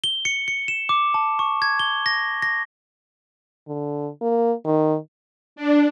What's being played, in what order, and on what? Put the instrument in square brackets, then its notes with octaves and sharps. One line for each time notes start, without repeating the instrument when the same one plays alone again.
[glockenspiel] G7
C#7
C#7
E7
D6
A5
C#6
G#6
G7
A#6
A#6
[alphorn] D3
A#3
D#3
[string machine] D4